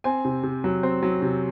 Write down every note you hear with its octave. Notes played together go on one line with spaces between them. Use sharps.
C4 G#5
C3
C3
F#3
C4
F#3
C3